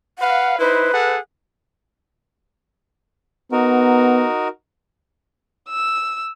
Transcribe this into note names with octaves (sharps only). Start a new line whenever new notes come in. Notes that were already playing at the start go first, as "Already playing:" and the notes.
B4 F5 F#5
D#4 E4 B4 C5
G#4 A4 F#5
B3 D#4 F#4 A#4
E6